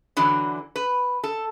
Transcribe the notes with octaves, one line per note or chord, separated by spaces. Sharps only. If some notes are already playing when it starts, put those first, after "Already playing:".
D3 E3 F#3
B4
A4